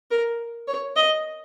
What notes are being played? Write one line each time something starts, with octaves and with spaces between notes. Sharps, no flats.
A#4
C#5
D#5